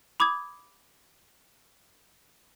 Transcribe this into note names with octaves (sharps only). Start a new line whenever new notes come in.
B5 D6 D#6 G#6